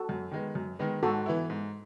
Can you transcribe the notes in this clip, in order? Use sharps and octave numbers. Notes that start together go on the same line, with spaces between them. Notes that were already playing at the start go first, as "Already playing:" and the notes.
Already playing: F#4 A4
F#2
D#3 G#3 B3
F#2
D#3 G#3 B3
G#2 F#4 A4
E3 B3 E4
G#2